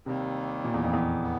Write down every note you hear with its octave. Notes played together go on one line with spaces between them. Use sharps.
D#2 C3 D#3 G3 A#3
A#2
E2
F2
E2
B3